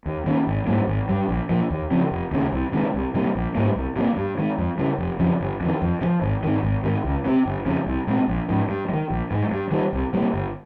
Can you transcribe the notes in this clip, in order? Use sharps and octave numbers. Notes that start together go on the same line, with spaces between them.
D#2
D#3 A#3 C#4
G#1
G#2 G3 A#3
G#1
G2 G3
A#1
A#2 F3
D#2
C#3 F3 C4
F1
D#2 C#3
C2
C3 D#3 G#3
C2
C3 G3 A#3
A#1
G#2 G3 A#3
C2
C3 G3 A#3
G2
D#3 G#3
F2
C#3 G3
F1
F2 C#3 F3
G1
F2 D#3
F2
C3
F3
G#1
G#2 D#3
G#1
G#2 D#3
C#2
C3 F3 C4
G1
F2 C#3
C2
A#2 G#3 C4
A#1
G#2 F3
G2
G#3
D#3
A#1
G#2 F3 G#3
G2
D#3 G3
C2
C3 G3 A#3
G1